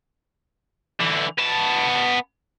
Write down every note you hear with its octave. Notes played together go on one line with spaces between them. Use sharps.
D3 E3
B3 A5